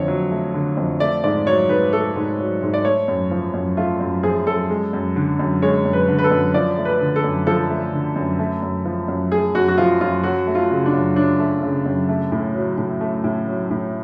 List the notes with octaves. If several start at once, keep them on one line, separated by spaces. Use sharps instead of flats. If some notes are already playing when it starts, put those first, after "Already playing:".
Already playing: F2 D3 A3 C#5
F#3
A3
D3
F2
A3 D5
G#2 D5
F#3 C#5
G#2 B4
A3 A4
G#2
F#3
G#2
D5
A3 C#5
F#2
F3
F#2
A3 F4
F#2
F3 G#4
F#2 A4
G#3
F#2
D3
F#2
G#3 C#5
F#2
B4
D3
B4
A4
F#2
F3 D5
A3
B4
D3
A4
F#2
F3 A4
A3
D3
F#2
A3
F#2
F3
F#2
A3 G#4
F#2 F#4
F#4
F3 F4
F#2 F4
F#3 F#4
A3
F4
C#3
D4
F#2
F#3 D4
A3
C#3
F#2
A3
A2
F#3
A2
A3
A2
F#3
A2